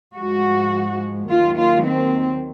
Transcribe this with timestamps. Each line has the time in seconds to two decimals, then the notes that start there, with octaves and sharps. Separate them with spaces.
0.17 G#2 F3 G#3 F#4
1.30 D#2 D#3 F#3 F4
1.58 F4
1.86 C4